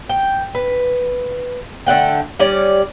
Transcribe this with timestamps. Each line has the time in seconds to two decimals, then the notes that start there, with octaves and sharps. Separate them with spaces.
0.09 G5
0.55 B4
1.87 D3 A3 F#5 G5
2.39 G3 C#4 D5